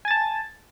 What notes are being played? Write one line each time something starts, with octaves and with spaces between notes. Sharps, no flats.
G#5 A5 A6